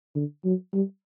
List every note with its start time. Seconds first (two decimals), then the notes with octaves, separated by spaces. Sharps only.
0.15 D3
0.45 F#3
0.73 G3